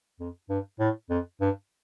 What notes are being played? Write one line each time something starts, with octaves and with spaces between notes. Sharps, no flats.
F2
G2
A2
F2
G2